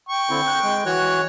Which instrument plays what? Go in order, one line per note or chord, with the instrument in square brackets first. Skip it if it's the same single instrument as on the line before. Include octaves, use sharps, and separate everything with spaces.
[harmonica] G5 C#6
[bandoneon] D3 C4 E4
F#6 G6
G#3
[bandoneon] E3 F#4 F#6 [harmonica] C#5